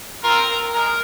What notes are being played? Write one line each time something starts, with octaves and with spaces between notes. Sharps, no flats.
C4 F4 A#4
G#3 A#4